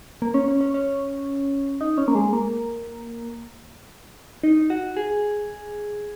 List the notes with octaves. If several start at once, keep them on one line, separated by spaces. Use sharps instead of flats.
A#3
C#4
C#4
C#4
C#4
D#4
C#4
A#3
G#3
A#3
D#4
F#4
G#4